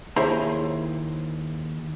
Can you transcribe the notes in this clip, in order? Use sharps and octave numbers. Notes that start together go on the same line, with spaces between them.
D#2 E4 G#4 C5 C#5 A#5